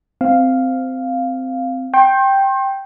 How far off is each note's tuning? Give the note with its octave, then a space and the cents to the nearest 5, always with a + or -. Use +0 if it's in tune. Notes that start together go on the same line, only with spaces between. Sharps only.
C4 -10 F5 +0
G5 +0 C6 +40